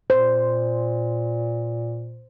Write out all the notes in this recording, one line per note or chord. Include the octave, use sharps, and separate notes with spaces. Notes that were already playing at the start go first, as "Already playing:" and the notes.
A#2 C5